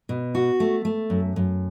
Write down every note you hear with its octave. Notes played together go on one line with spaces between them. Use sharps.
B2
F#4
A3
A3
F#2
F#2